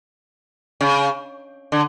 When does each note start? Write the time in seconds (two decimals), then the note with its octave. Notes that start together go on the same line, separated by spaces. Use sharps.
0.81 C#3
1.72 D3